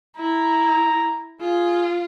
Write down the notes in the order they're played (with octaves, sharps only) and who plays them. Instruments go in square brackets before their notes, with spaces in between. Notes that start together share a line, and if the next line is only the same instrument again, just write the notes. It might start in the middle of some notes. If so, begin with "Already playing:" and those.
[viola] E4 [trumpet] A#5
[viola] F4 [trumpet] G#4